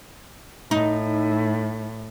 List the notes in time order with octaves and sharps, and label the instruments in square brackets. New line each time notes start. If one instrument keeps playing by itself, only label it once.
[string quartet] A2 [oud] D#4